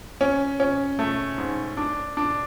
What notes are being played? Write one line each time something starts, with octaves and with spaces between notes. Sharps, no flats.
C#4
C#4
A3
G#2
D4
D4